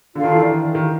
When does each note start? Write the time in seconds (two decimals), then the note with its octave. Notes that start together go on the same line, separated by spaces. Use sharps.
0.15 D3 F4 A4 D5 F5
0.24 D#3
0.33 E3
0.42 D#3
0.75 D#3